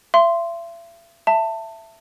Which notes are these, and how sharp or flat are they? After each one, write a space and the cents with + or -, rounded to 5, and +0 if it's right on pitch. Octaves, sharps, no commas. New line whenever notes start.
E5 +40 C6 -5
E5 +10 A5 +20